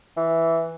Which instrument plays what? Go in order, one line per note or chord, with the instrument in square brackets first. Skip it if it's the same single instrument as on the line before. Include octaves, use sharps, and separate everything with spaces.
[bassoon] E3